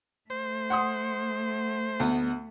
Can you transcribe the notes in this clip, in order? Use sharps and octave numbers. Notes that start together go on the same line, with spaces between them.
A3 C5
F#5 C6 D#6
D2 B3 D#4 B4